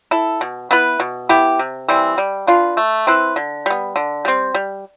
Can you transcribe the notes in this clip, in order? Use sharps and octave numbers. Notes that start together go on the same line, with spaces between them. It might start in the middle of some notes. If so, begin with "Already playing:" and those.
E4 A4
B2
B3 E4 B4
B2
B3 E4 G4
C3
E3 G3 C4
G3
D4 F4 B4
A3
C4 E4 B4
D3
G3 B3
D3
G3 C4
G3